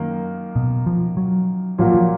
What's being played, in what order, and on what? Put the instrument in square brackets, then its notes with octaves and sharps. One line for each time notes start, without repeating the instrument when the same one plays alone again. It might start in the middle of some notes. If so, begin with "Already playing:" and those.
Already playing: [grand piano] F#2 D#3 A#3
[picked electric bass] B2
F3
F#3
[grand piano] A#2 F#3 A#3 F4 [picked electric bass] F3
[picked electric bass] F3